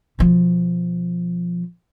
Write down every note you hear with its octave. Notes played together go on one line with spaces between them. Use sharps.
B2 F3